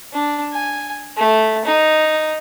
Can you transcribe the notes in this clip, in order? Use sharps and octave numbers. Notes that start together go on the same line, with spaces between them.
D4
G#5
A3
D#4